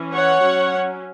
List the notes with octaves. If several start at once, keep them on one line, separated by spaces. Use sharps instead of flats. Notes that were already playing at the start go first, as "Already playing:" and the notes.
Already playing: E3 C#4
C#5 F#5
F#3 C#4